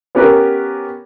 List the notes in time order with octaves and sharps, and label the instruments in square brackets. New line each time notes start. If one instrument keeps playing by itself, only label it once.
[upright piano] B3 C#4 G4 A#4 B4